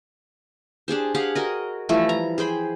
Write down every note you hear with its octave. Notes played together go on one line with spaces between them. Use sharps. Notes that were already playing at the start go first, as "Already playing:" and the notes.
D4 G4 G#4 C5
G4 G#4 F5 F#5
F#4 A#4 D#5
E3 F3 G3 A3
A#5
G#4 C5 G5 B5